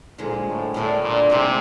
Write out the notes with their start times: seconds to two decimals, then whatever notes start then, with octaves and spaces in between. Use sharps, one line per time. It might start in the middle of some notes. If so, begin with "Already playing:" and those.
0.18 G2 A#2 D3 F3 G#3
0.46 A2
0.74 F#2 A2 D3 G3 A#3 D4
1.02 A#2
1.30 A2 C3 E3 G#3 C4 F4